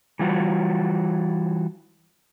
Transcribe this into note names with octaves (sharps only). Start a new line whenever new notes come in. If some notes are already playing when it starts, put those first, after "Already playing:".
E3 G3 F4 F#4